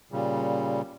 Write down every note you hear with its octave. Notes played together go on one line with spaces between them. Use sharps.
A#2 C#3 G3